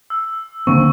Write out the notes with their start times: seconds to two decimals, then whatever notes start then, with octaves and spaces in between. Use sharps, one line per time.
0.10 E6
0.67 D3 A#3 C4 C#6